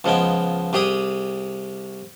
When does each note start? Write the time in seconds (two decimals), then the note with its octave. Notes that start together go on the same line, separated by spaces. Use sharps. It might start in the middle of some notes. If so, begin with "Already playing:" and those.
0.04 C#2 F3 G#3 B3 G5
0.73 C2 G4 G#4 G5 D#6